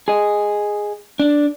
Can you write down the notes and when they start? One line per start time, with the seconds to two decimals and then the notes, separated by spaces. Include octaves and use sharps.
0.08 G#4 D#5
1.20 D4